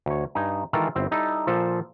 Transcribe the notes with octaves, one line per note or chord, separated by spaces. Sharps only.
D2 C#5
G2 D#4 G#5
D#3 E3 G#3 F4 A4 A#4
G1 C4 E4
G3 D#4 E4 A4
A#2 F3 A4 C5